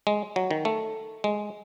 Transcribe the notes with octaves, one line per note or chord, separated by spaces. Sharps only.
G#3
F#3
D#3
A3
G#3